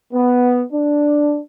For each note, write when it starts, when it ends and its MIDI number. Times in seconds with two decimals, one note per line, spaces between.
0.13 0.62 59
0.73 1.39 62